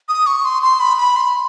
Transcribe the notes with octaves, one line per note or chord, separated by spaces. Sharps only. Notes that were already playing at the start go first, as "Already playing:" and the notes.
D#6
C#6
C6
C6
B5
B5
C6